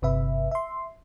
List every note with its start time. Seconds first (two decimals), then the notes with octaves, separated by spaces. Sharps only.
0.02 G1 C3 B4 E5
0.51 E5 C6